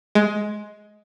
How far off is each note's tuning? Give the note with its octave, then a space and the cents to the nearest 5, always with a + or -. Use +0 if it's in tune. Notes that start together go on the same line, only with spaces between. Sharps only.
G#3 +15